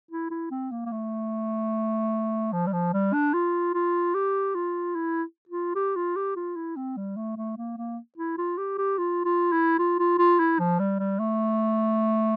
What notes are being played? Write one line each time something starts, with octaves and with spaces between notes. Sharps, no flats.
E4
E4
C4
A#3
A#3
A3
F3
G3
F3
G3
D4
F4
F4
G4
F4
E4
F4
G4
F4
G4
F4
E4
C4
G3
A3
A3
A#3
A#3
E4
F4
G4
G4
F4
F4
E4
F4
F4
F4
E4
F3
G3
G3
A3